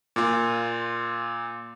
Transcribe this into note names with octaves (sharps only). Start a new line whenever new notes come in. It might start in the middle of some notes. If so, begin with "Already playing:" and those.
A#2 F4